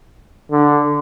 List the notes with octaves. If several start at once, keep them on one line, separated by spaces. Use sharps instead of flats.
D3